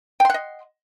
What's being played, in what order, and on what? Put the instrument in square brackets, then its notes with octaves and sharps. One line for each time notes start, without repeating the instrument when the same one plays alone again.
[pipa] G5
C6
F#5
D#5